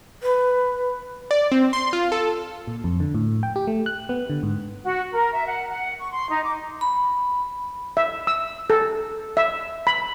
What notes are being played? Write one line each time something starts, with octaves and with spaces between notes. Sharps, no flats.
B4
D5
C4
C6
F4
A4
A#2
F2
D3
A2
G5
G4
A3
F#6
B3
D3
G#2
F#4
A#4
E5
F#5
F#5
C#6
C6
D#4
D6
B5
E5
E6
A4
E5
B5